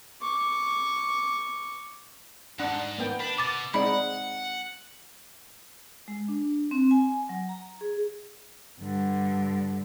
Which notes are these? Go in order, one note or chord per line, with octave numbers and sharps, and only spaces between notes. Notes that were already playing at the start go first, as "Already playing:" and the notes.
C#6 D6
G#2 D4 F#5
A#3 B3 G5
D4 B5
B2 D6 A6
G#3 C4 D#4 D5 F#5 B5
G#3
D4
C4
G#5
F#3
A#5
G#4
G2 D3